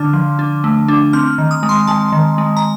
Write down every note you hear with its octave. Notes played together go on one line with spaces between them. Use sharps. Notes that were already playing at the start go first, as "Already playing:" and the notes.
Already playing: D3 D4 F6
F3
D4
A3
D4
C4 F6
D#3
D#6
G#3
C6
G#3 A5
D#3
G#3
A#5